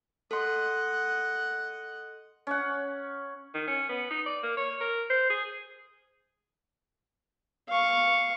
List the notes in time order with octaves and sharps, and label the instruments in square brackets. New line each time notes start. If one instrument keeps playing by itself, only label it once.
[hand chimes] A4 C6 [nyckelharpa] D#5 F#5
[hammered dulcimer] C#4 F#5
[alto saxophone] D#3
C#4
B3
D#4
D5
A#3
C#5
A#4
C5
G#4
[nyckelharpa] F5 C#6